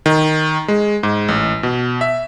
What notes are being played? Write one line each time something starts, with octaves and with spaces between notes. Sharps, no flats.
D#3
G#3
G#2
A1
B2
E5